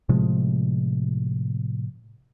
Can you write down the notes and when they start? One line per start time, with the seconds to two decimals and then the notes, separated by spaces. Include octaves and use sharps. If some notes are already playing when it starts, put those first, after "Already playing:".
0.09 A2 C3 F3 G#3